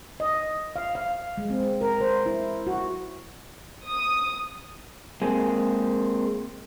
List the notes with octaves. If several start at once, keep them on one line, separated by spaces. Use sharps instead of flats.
D#5
F5
F5
G#3
C4
A#4
C5
E4
F#4
D#6
G#3 A#3 C4 G#4